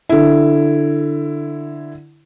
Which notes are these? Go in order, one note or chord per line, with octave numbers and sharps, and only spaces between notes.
D3 E4